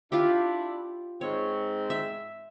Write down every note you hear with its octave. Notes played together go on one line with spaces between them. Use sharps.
D4 E4 F4 G4
G#2 C4 C#5
E5